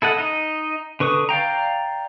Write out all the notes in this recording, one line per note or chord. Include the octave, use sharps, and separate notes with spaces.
E4 A4 D#5 F#5
D#4 D#5
D3 B4 C#6 D#6
D5 F5 G5 A#5